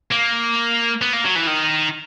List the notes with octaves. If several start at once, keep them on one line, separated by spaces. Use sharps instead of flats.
A#3
B3
A#3
F#3
E3
D#3